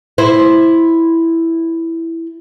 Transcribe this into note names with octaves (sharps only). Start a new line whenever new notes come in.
E4 C5